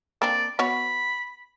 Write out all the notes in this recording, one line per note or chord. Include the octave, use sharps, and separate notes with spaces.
A#3 C4 D4 D5
B3 F#4 C#5 B5